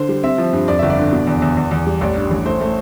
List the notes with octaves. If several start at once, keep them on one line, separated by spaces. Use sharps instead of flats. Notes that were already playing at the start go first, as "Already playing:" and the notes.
Already playing: D3 C5
G3
C4 E5
F3
G2
F2 D5
G1 E5
D5
D3
B2
E2
E2
E2
E2
G3
A1 D5
G2
A1
A3 C5
A3